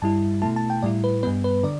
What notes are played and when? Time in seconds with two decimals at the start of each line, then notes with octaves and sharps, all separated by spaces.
0.02 G2 G3 E4 A5
0.42 B2 A3 E4 A5
0.56 A5
0.70 G5
0.83 A2 G3 E4 D5
1.04 B4
1.23 G2 G3 B3 B4
1.44 B4
1.63 D3 D5